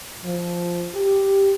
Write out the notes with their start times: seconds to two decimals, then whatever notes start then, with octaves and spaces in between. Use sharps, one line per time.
0.25 F3
0.95 G4